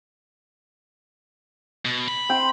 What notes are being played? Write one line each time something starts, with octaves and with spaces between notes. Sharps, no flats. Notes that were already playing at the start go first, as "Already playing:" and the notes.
B2
B5
C4 G5 C6